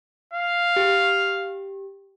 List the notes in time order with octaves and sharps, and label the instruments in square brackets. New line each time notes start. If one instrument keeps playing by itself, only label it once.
[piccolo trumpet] F5
[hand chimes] G4